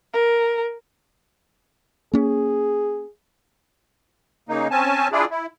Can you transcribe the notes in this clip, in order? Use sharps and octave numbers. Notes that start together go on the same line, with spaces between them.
A#4
A#3 C#4 G#4
C#3 A#3 D#4
C4 C#4 G#5 A5
D4 E4 F4 G#4 D5
E4